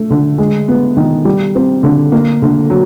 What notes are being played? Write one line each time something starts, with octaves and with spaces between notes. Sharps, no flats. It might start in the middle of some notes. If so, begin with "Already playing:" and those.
Already playing: A3
D3
G#3
B3
D#3
G3
C4
D3
A#3
D3
F#3